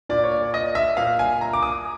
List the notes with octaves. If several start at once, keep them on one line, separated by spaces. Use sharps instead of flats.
A#2 D5
C#5
D5
D#5
E5
A#2 F5
G#5
A#5
D6
D#6